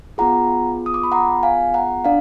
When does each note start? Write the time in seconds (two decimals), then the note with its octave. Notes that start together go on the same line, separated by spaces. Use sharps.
0.18 B3 F4 G#4 F#5 A#5
0.86 D#6
0.94 D6
1.03 B5
1.12 F#5 A#5
1.43 F5 G#5
1.74 F#5 A#5
2.05 D4 D5 F5